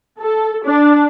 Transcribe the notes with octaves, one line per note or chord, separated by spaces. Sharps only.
A4
D4